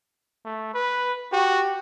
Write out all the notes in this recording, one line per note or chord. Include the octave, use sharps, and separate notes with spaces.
A3
B4
F#4 G4